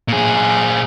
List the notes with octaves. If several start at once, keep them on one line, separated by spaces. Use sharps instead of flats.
A#2 G#4